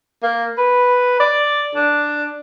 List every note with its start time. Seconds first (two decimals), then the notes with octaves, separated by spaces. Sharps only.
0.23 A#3
0.58 B4
1.20 D5
1.75 D4